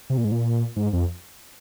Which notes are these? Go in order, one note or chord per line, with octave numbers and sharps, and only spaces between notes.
C3
A#2
G#2
A#2
G#2
F2